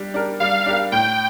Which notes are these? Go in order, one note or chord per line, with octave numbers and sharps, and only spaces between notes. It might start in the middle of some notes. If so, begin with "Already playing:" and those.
Already playing: G3 D4 G4
D4 G4 A#4
G3 F5
D4 G4 A#4
A2 G5